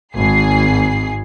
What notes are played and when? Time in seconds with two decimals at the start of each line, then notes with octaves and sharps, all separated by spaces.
0.15 G#1 G#4 C7